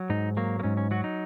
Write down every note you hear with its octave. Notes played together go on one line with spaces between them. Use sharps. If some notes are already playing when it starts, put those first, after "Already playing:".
Already playing: F#3
G#2 D#4
F#3 A#3
A#3
G#2 C#4
C#4
F#3 F#4
D#4